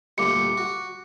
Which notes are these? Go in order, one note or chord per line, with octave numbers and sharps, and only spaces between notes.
D2 A#2 G3 D6 C#7
F#4